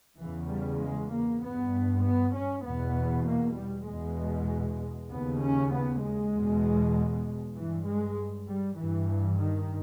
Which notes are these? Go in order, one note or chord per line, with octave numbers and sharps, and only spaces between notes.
E2 C#3 E3
G3
G#3
A#3
G2 B3
B3
C#4
E2 B2 B3
A#3
G3
E2 B2 G#3
D#2 C#3 B3
C#4
B3
G#3
E2 B2
G2 E3
G#3
G3
G2 E3
D#3